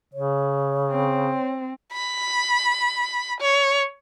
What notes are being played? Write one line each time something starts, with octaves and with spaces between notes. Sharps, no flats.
C#3 C#5
C4
B5
C#5